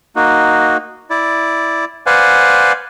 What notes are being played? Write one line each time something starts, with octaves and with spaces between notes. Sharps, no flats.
A#3 D#4 F#4
E4 D5
B4 C5 D5 F5 F#5 G#5